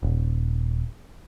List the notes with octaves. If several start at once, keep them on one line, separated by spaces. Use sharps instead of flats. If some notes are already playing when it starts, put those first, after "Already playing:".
D#1